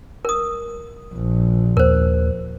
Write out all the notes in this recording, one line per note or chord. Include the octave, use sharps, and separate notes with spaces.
A#4 D#6
A#1
D#2 A#4 C5